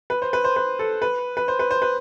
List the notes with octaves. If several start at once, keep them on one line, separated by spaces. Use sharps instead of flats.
B4
C5
B4
C5
B4
A4
B4
B4
C5
B4
C5
B4